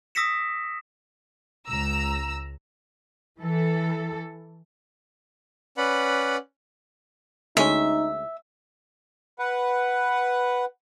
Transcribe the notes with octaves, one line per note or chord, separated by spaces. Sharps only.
D#6 E6 A#6 B6 C#7 E7
C#2 A#5 E6
E3 A4
C#4 B4 D5 F#5 B5
D2 G#3 C#4 D#4 E5
B4 F#5